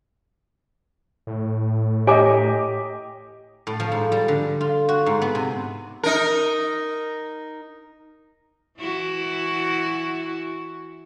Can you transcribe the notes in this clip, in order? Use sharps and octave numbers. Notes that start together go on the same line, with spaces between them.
A2
G4 C#5 D#5 G#5 A#5 D6
A2
F3
G#2
G3
D3
F4
F#4
G#2
B3
C3
D#4 A#4
E3 E4 F#4